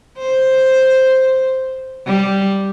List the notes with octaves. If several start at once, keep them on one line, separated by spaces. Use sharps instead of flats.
C5
G3